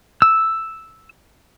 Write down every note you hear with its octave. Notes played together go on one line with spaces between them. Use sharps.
E6